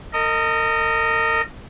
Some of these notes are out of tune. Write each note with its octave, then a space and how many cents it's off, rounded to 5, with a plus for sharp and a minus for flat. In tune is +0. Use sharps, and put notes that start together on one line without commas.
A#4 -40 D#5 +0